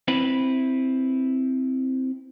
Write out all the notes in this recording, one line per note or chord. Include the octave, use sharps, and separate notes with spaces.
C4 E4 B4